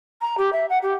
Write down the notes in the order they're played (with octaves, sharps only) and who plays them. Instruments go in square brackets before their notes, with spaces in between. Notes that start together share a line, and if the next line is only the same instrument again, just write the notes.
[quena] A#5
G4
E5
F#5
G4